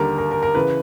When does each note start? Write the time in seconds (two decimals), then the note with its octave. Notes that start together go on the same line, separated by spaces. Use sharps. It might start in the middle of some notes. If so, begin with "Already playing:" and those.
Already playing: D#2 D3 G3 A#4
0.18 A#4
0.31 A#4
0.43 A#4
0.55 C#3 E3 B4